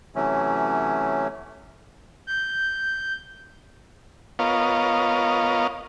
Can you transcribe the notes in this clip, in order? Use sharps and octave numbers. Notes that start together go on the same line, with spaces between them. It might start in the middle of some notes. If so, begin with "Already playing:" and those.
C3 E3 F#3 A3 C#4
G6
B3 F4 A#4 C#5 D#5 F5